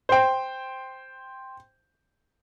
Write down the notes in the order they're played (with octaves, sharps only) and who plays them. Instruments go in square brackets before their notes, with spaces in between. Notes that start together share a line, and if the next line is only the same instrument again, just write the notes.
[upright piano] C5 G5